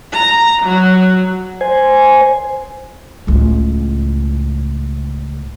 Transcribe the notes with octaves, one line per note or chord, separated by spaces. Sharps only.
A#5
F#3
C5 G#5
C#2 A2